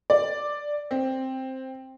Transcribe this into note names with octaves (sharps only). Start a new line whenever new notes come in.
D5
C4